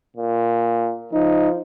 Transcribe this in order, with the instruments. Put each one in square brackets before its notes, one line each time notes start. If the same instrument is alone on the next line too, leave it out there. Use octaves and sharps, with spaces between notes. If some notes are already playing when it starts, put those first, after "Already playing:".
[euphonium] A#2
[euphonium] F3 [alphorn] D#4